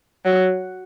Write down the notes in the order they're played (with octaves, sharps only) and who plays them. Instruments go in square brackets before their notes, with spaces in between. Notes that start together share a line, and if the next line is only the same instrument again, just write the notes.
[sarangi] F#3